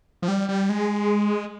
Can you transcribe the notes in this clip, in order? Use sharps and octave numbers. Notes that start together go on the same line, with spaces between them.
F3
G3
G3
G#3